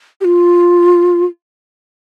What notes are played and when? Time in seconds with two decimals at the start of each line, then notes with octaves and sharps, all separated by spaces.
0.21 G4
0.25 F4